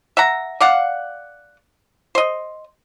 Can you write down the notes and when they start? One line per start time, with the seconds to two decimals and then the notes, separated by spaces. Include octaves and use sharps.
0.17 E5 F#5 A#5
0.60 D5 F5 F#5
2.15 C5 D#5